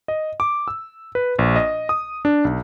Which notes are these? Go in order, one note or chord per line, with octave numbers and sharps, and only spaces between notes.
D#5
D6
E6
B4
A#1
D#5
D#6
D4
B1